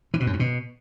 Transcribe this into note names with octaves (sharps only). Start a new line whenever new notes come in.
E3
B2
F#2
G2
B2